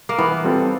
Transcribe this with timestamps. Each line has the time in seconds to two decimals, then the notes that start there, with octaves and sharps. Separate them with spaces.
0.09 A#3
0.18 E3 B3
0.44 G3 C4 F4 A4